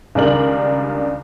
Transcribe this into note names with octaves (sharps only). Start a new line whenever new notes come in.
C#2 D#3 G3 D4 A#4 F#7